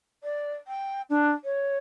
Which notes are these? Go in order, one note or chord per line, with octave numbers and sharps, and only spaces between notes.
D5
G5
D4
C#5